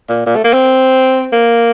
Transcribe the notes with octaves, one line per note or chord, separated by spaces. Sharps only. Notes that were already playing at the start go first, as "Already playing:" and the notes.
A#2
A#2
A3
A#3
C4
A#3